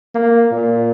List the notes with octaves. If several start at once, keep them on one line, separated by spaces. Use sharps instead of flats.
A#3
A#2